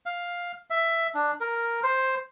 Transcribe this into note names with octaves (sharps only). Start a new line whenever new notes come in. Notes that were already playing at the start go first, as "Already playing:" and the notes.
F5
E5
D4
A#4
C5